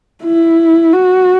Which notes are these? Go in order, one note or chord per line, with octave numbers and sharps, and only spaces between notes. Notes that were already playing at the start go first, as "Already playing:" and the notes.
E4
F#4